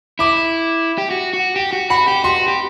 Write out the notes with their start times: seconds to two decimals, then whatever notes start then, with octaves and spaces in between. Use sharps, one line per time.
0.19 E4 D6
0.98 G4
1.11 F#4
1.34 F#4
1.56 G4
1.73 F#4
1.90 F#4 B5
2.08 G4
2.24 F#4 C6
2.48 G4